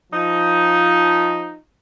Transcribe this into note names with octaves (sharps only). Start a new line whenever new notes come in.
F3 D#4